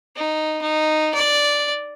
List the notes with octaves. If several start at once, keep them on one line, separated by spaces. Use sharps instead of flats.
D#4
D#4
D5